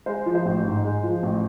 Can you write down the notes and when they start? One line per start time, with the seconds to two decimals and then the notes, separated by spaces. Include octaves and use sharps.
0.06 G#3 C5
0.26 F3
0.35 C5
0.45 A1
0.64 G#2
0.84 G#3
1.04 F3
1.23 A1